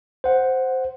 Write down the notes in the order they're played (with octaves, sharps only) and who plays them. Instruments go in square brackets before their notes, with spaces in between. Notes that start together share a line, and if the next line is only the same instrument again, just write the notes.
[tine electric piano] C5 F#5